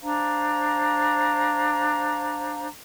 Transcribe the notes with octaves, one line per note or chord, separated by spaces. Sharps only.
D4 C5 F5 A#5